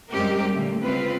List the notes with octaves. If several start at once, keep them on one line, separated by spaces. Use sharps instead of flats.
F#2 G3 G#3 C4 G4 A#4
A#2 D3 A3 A#3
C#3 G#3 B3 C4 F4 B4